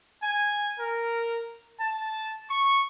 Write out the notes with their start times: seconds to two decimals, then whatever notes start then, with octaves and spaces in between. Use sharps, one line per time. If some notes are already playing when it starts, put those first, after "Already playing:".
0.23 G#5
0.78 A#4
1.80 A5
2.49 C#6